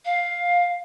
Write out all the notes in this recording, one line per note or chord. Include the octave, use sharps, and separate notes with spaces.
F5